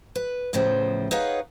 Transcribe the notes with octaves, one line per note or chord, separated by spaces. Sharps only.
B4
E2 A2 C#3 F3 C5
D#4 G#4 B4 C#5 F5 F#5